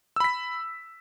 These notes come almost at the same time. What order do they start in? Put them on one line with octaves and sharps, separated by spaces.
E6 B5 B6